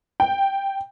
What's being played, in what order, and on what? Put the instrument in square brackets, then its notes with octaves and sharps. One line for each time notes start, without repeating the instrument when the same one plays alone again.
[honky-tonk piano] G5